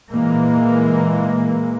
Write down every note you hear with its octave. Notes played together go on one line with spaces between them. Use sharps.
A#2 E3 G#3 A#3